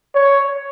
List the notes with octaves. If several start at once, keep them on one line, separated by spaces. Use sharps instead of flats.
C#5